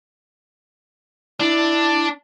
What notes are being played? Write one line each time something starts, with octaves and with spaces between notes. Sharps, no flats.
D4 E4